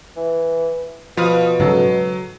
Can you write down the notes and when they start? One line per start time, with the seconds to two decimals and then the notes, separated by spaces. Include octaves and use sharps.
0.17 E3
1.17 B2 F3 B4 F5 D#6
1.60 G#2 C#3 F#3 A4